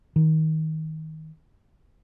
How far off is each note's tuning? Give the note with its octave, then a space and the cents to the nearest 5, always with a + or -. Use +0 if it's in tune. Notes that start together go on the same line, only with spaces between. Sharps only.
D#3 +20